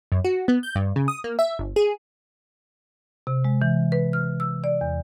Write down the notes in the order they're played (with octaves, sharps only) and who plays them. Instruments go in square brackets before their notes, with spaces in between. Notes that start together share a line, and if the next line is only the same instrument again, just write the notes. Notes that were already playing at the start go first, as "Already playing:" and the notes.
[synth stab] F#2
F#4
B3
G6
G2
C#3
D#6
A#3
E5
G1
G#4
[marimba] C3
G#3
E3
B4
F6
E6
D5
E2